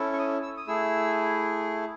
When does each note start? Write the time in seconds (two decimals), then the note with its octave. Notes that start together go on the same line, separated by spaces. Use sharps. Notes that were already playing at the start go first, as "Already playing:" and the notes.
Already playing: C#4 E4 A4
0.13 C#6
0.19 D#6
0.43 E6
0.57 D#6
0.67 A3 E4 G#4 E6